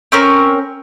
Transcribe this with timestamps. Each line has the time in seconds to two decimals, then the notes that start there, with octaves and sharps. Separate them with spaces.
0.12 C4 C#4 A#4